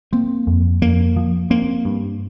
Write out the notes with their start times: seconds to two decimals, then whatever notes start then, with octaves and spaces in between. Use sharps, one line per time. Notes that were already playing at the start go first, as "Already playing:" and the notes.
0.13 A#3 C4
0.47 F2
0.82 F2 A#3
1.16 F3
1.50 A#3 C4
1.85 G2